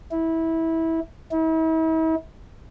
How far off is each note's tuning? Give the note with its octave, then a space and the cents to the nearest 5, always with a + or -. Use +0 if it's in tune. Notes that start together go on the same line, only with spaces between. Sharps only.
E4 -20
E4 -45